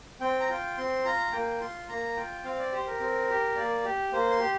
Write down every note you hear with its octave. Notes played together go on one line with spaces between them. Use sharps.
C4 G5
A#5
F4 G5
C4 C6
F4 A#5
A#3 G5
F4 C6
A#3 A#5
F4 G5
C4 F5
D5
G4 C5
A#4
C4
G4
A#3 D5
G4
A#3 C5
C6
G4